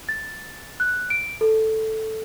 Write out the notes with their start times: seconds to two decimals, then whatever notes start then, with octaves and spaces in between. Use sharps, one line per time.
0.09 A6
0.80 F#6
1.10 D7
1.41 A4